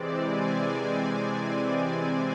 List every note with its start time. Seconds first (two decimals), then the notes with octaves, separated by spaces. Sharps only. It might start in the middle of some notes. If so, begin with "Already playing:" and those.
Already playing: C3 E3 G#3 C4 D5
0.26 G#5